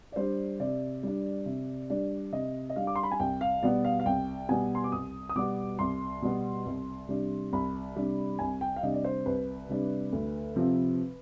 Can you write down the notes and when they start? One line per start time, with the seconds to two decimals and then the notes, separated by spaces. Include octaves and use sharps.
0.12 D5
0.16 G3 D4 C5
0.60 C3 D5
1.03 G3 D4
1.46 C3
1.90 G3 D4
2.32 C3 D#5
2.70 D#5
2.76 G3 D4 F5
2.87 D6
2.96 C6
3.03 B5
3.11 G#5
3.20 C2 G5
3.41 F5
3.63 B2 G3 B3 D5
3.85 F5
4.00 F5
4.05 C2 G5
4.49 B2 G3 B3 G#5
4.75 C6
4.84 D6
4.92 C2 D#6
5.29 D#6
5.35 B2 G3 B3 D6
5.79 C2 C6
6.22 B2 G3 B3
6.66 C2
7.09 C3 G3 D4
7.53 C2 B5
7.96 C3 G3 D4
8.39 C2 G#5
8.61 G5
8.76 F5
8.83 C3 G3 D4 D#5
8.94 D5
9.05 C5
9.26 C2 B4
9.69 C3 G3 D4
10.12 D2
10.56 C3 F3 C4